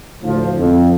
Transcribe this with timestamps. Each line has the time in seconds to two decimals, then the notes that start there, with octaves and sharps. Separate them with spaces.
0.23 D2 A2 F3
0.57 F2